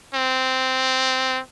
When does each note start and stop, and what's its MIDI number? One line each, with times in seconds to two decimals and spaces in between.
0.14 1.40 60